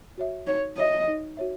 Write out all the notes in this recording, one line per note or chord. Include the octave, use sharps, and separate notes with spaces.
F#4 C#5 E5
D#4 C#5
F#4 C#5 D#5 E5
D#4
F#4 C#5 E5